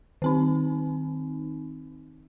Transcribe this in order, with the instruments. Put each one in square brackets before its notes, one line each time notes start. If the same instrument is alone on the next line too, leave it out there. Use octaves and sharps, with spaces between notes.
[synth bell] D#3 C4 D#4